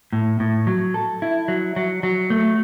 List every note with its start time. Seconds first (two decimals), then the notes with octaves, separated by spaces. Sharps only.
0.13 A2
0.40 A2
0.67 F#3
0.94 A4
1.22 E4
1.48 F#3
1.76 F#3
2.03 F#3
2.30 A3